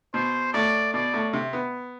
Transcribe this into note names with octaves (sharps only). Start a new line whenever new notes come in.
B2 C5
A2 D5
B2 D5
A2
C3
B3